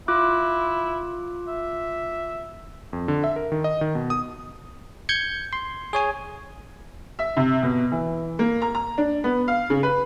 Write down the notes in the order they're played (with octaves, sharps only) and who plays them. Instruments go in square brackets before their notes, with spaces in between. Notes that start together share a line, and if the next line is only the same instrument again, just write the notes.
[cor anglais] E4 [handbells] F4 D6 F#6
[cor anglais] E5
[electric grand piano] F2
D3
E5
A#4
D#3
D#5
D#3
B2
D#6
[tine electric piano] G6 G#6 C#7
C6
G#4 C#5 G#5
[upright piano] E5
C3
B2
E3
A#3
A#5
A#5
D4
B3
F5
C#3
B4